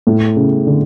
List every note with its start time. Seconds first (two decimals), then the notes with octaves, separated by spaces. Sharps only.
0.07 A2
0.36 C#3
0.67 D3